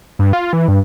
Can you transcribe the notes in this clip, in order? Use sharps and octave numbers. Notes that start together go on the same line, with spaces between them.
G2
F4
E3
G2